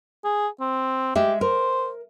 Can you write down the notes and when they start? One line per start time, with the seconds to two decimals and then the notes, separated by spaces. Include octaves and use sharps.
0.24 G#4
0.60 C4
1.15 G#3 G4 E5
1.41 A#4 C5